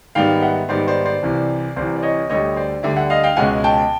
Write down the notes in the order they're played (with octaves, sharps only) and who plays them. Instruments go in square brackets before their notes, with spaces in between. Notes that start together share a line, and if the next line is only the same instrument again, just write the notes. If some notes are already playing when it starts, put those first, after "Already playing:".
[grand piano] G#2 D#3 G3 B3 F5 G5
E5 F#5
G#2 D#3 G3 B3 C5 D5
C5 D5
C5 D5
C2 C3 E3
C2 C3 E3 C5 D5
D5
C#5 D#5
D2 D3 G3 C#5 D#5
C5 D5
D2 D3 G3 D5 E5
E5 F#5
D#5 F5
F5 G5
C#2 B2 G#3 C#4 F#5 G#5
G5 A5